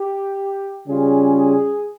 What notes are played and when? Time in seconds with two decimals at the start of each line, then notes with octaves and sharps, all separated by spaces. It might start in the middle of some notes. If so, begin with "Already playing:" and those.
Already playing: G4
0.87 C#3 G3 C#4 F4 G#4
1.36 G#4